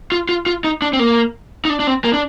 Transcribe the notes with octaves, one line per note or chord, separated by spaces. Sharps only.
F4
F4
F4
D#4
D4
C4
A#3
D#4
D4
D4
C4
A#3
D4